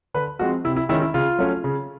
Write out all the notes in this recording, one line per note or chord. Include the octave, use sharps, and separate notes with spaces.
D3 B4
F3 G#3 C4 F#4
C3 E4
E4
D#3 G#3 C#4 E4
E4
C#3 F4
F#3 A3 C#4
C#3